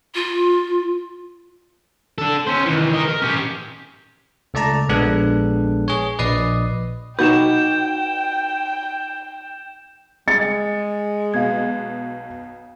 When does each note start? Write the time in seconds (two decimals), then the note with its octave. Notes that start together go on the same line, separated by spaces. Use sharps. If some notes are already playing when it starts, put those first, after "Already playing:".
0.15 F4
2.18 D4 A4
2.46 C#4 C5
2.65 D#3 E3
2.94 A#4 D#5
3.08 A#4
3.22 C#4 G4
4.54 C#2 A3 D5 A5 A#5
4.89 A#1 G#3 B3 D4 A4 F#6
5.88 G#4 C#5
6.19 A#1 B4 D5 D#5 D#6 C7
7.19 D#4 F#4 B4 G5 G6 E7
10.28 G#3 A6 C#7
11.34 B1 B2 F5 G#6